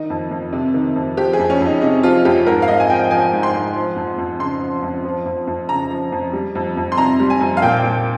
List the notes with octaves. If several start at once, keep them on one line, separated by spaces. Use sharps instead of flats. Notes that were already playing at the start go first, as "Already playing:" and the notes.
Already playing: D#3 D#4
F2
F2
C3
D#3
F2
F3 G4
G#4
F2
C#4
F2
D#4
C3 D#4
F3 F4
F2 G4
G#2 A#4
F5
G#2 D#5
G#5
F3 G5
F3 G#5
G#2
C6
G#2
F3
F2
F2
C#3 C6
F3
F2
F3
F2
F2
C#3 A#5
F3
F2
G3
F2
F2
C6
C3 A#5
G3
G#5
F2
F5
A#2 G5
A#2